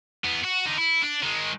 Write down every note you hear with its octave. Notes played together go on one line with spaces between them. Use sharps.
E2 B3
F#4
D3 D#4
E4
D4
D#3 G#3